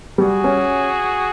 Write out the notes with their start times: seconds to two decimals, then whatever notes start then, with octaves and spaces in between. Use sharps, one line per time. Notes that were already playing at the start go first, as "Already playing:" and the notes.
0.18 G3 F#4 G#4
0.44 C#4